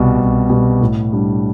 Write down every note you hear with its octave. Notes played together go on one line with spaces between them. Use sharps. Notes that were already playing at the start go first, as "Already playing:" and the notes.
Already playing: C2 B2 G3
C2
B2 G3
A2
G3 D4